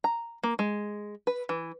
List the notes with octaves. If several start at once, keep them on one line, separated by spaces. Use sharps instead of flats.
A#5
A#3
G#3
B4
E3